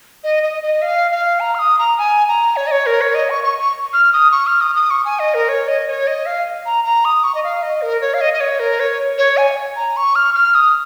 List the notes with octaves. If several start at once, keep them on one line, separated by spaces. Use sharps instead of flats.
D#5
D#5
D#5
F5
F5
A#5
F6
D#6
A#5
G#5
A#5
C#5
D#5
C#5
A#4
C#5
D#5
C#6
C#6
C#6
F6
D#6
C#6
F6
D#6
D#6
C#6
G#5
D#5
A#4
C#5
D#5
C#5
D#5
F5
A#5
A#5
D#6
C#6
D#5
F5
D#5
A#4
C#5
F5
D#5
D#5
C#5
A#4
C#5
C#5
G#5
A#5
C#6
F6
F6
D#6